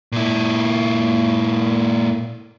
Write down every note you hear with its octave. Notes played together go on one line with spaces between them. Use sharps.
A#2 E4